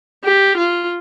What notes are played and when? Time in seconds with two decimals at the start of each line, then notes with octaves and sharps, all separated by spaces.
0.25 G4
0.57 F4